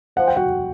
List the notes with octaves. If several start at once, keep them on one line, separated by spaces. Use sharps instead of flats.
F3 F#5
G5
F#4 F#5